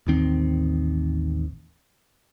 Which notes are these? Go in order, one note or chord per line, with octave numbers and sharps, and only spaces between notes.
A1 D#2 D#3 C4